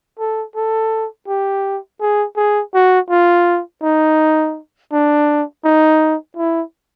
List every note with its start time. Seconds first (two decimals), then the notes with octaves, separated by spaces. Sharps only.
0.19 A4
0.56 A4
1.27 G4
2.00 G#4
2.36 G#4
2.74 F#4
3.10 F4
3.83 D#4
4.92 D4
5.65 D#4
6.37 E4